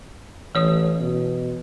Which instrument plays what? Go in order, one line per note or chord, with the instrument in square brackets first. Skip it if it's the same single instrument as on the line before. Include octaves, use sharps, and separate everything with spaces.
[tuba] A1 [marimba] E3 C#5 D#6
[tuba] B2